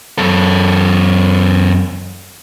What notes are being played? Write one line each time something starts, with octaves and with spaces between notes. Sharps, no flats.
F#2 A4